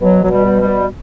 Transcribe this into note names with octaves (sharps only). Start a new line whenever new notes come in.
B2 F#3
B2 F#3
G3
B2
G3
B2